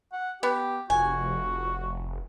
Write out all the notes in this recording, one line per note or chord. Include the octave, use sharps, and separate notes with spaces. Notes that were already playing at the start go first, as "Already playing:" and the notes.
F#5
B3 G4
F1 F#4 G#5